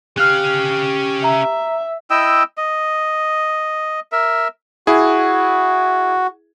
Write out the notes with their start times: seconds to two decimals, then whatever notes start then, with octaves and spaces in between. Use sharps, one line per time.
0.18 C#4 G4 F5 F6 F#6
1.24 E5 A#5
2.10 E4 D#5 G5 E6
2.57 D#5
4.12 A#4 E5
4.87 E4 F#4 G#4